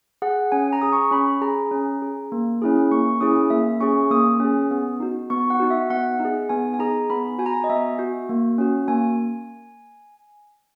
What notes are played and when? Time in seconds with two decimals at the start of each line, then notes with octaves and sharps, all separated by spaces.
0.22 G#4 F#5
0.52 C#4 G#5
0.73 A#5
0.81 G#4 D#6
0.93 C#6
1.11 C#4 B5
1.41 G#4 A#5
1.71 C#4
2.02 G#4
2.32 A#3
2.62 C#4 E4 G#4
2.92 A#3 C#6
3.21 C#4 E4 G#4 D#6
3.50 A#3 E5
3.81 C#4 G#4 C#6
4.10 A#3 D#6
4.40 C#4 G#4
4.71 B3
5.00 D#4 F#4
5.30 B3 C#6
5.50 F#5
5.60 D#4 F#4
5.70 E5
5.90 B3 F#5
6.20 D#4 G#4
6.49 B3 G#5
6.74 G#5
6.79 D#4 G#4 A#5
7.10 B3 B5
7.39 F#4 G#5
7.46 A#5
7.54 G#5
7.64 D#5
7.69 B3 E5
7.99 F#4
8.29 A#3
8.58 C#4 F#4
8.88 A#3 G#5